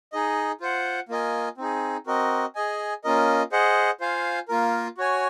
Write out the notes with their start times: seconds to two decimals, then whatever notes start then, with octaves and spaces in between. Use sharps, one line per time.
0.13 D#4 G#4 D#5
0.61 F4 C5 F#5
1.09 A#3 F4 A#4 D#5 G#5
1.58 C4 D#4 G#4
2.07 C4 F#4 A#4 D#5
2.55 G#4 D#5 G#5
3.04 A#3 C#4 F4 A#4 D#5
3.52 G#4 C5 D#5 F#5
4.00 F4 C5 F5 G#5
4.48 A#3 F4 A#4
4.98 F#4 C#5 G#5